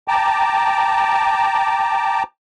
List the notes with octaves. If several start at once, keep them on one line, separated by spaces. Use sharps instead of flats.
G5 A5 A#5 D6